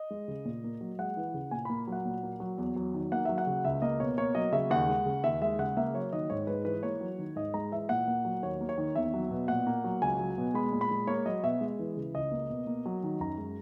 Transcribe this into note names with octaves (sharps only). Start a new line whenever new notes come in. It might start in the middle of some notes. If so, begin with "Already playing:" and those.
Already playing: D#5
G#3
C#3
A#2
A#3
F#3
G#3 F#5
E3
C#3
A#2 G#5
A#3 B5
F#3 F#5
A#2
A#3
F#3
E2
F#3
D#3
A#3 F#5
F#3 E5
F#5
C#3
C#2 E5
A#3 D#5
B2 C#5
A#3 C#5
F#3 D#5
C#3 E5
D#2 F#5
G#3
C#3
D#2 E5
G#3 E5
C#3 F#5
A#3 E5
F#3 C#5
D#3 D#5
G#2 C#5
G#3 B4
E3 B4
A#3 C#5
F#3
D#3
G#2 D#5
G#3 A#5
E3 E5
A#2 F#5
A#3
F#3
D#2 C#5
A#3
C#5
D#3
E2 E5
F#3
B2
A#2 F#5
A#3
F#3
C#2 G#5
F#3
B2
G#3 B5
A#2
B5
G#3
A#3 C#5
F#3 D#5
B2 E5
G#3
E3
C#3
C#2 D#5
A#3
B2
A#3
F#3
D#3
F#2 A#5
G#3